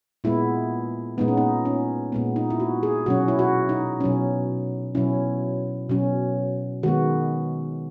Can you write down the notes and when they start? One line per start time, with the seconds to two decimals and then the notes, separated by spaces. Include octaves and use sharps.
0.24 A#2 G#3 B3 E4
1.18 A#2 G#3 B3 D#4
1.28 C#4
1.37 D#4
1.65 C#4
2.12 A#2 G#3 B3
2.36 D#4
2.50 E4
2.60 F#4
2.83 G#4
3.06 B2 F#3 C#4 F#4
3.28 E4
3.39 F#4
3.69 D#4
4.01 B2 F#3 C#4
4.95 B2 F#3 C#4 E4
5.89 B2 F#3 C#4
6.83 D#3 G#3 B3 F#4